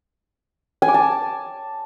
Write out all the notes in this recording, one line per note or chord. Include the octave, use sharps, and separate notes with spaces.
G#5
D6
A5